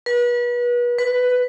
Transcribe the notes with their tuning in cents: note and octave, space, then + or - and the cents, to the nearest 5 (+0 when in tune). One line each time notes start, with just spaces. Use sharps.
B4 -35
B4 +10